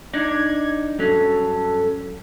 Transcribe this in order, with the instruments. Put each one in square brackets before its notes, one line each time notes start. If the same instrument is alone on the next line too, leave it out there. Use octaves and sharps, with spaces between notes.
[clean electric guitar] D4 D#4 D5 [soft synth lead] G#6
[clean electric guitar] G2 F#3 C#4 [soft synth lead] A4